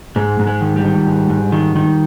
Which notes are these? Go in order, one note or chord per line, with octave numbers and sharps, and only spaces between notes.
G#2 G#3
G#2
G#3
D#3
G3
D#3
G#2
G#2
D#3
D#3